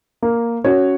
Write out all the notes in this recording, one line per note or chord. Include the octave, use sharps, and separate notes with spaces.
A#3
C#4 F#4 C#5